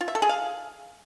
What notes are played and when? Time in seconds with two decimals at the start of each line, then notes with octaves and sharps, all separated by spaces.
0.01 F4
0.08 E5
0.15 A4
0.22 G#4
0.29 F5